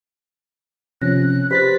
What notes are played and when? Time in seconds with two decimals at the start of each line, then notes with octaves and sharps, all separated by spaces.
1.02 C3 F3 C#4 F#6 A#6
1.51 G4 B4 C5 B5 A6 B6